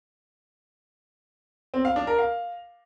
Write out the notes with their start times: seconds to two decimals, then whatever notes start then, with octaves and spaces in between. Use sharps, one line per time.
1.74 C4
1.85 F5
1.96 D4
2.07 A#4
2.19 F5